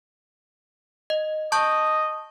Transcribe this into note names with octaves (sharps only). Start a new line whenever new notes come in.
D#5
D#5 A5 C#6 G6